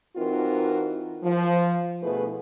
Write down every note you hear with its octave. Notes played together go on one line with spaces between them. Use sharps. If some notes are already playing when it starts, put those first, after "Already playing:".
E3 C4 D#4 F4 F#4 A#4
F3
D2 B2 A3 E4 G#4 B4